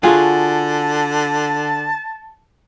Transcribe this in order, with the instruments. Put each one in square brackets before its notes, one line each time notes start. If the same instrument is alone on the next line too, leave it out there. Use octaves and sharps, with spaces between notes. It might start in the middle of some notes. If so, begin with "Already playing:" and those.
[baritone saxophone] D3 [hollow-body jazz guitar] F4 F#4 [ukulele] G#4 [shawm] A5